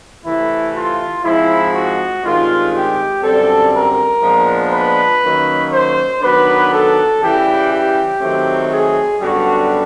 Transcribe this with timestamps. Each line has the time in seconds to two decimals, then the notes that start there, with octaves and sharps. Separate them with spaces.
0.23 C3 E3 A3 E4
0.73 F4
1.23 G#2 F3 G#3 C4 E4
1.73 F#4
2.23 G2 D#3 G#3 C4 F4
2.72 G4
3.22 F#2 D3 G3 C4 A4
3.73 A#4
4.22 A#2 F3 G#3 B3 D4
4.72 B4
5.22 D#3 F#3 A#3 C#4
5.71 C5
6.21 D#3 F#3 B3 D4 B4
6.71 A4
7.21 C#3 E3 G3 G4
7.71 G4
8.20 D#3 F#3 A3 C4
8.70 G#4
9.20 F#2 D3 G3 B3 D4 F#4